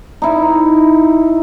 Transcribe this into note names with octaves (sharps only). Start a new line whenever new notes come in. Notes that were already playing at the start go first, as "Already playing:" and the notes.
D#4 E4